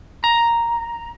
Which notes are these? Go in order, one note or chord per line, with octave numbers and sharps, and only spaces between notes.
A#5